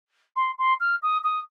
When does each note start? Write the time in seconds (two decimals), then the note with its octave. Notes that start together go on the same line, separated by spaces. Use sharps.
0.36 C6
0.58 C6
0.80 F6
1.02 D#6
1.24 D#6